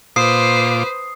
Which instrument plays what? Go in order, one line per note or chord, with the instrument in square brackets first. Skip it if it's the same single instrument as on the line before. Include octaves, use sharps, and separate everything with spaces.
[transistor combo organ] A#2 F4 D6 [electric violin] B4 C5 [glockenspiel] D#6 C7